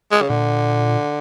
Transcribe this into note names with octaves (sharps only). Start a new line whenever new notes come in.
G#3
C#3
A#2 D3